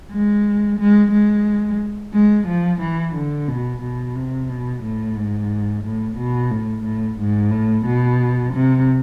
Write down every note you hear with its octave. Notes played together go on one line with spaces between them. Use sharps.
G#3
G#3
G#3
G#3
F3
E3
D3
B2
B2
C3
B2
A2
G#2
A2
B2
A2
A2
G#2
A2
B2
C3